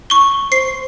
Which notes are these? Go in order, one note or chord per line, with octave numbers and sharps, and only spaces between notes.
C#6 G7
C5 C7